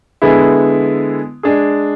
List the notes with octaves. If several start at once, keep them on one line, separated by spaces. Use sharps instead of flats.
D3 G#3 B3 E4 G#4
G#3 D4 G#4